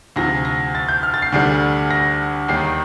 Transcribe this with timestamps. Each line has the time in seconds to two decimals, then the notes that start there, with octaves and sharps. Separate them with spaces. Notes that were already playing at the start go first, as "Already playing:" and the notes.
0.16 D2 C3 F3 A#6
0.45 A#6
0.75 A6
0.89 G6
1.03 F6
1.14 A6
1.22 C7
1.32 D2 D3 G3
1.91 A#6
2.48 D#2 D#3 G3 C7